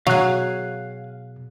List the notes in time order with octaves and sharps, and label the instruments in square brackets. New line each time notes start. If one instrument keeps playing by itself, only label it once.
[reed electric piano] B2 [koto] F#3 G#4 [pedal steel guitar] F5 F#6